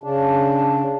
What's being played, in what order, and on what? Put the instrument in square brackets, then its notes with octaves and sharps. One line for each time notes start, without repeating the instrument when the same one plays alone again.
[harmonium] C#3 D4